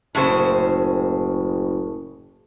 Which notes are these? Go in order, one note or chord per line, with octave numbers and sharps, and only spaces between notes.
F#1 A2 C#3 C5